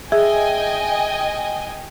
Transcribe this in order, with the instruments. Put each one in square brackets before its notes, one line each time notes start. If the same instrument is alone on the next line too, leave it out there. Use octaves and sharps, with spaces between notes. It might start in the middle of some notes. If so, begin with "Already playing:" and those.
[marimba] G#4 [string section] D#5 G5 G#5 [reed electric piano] E5